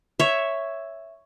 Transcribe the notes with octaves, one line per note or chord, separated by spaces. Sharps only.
C#5 E5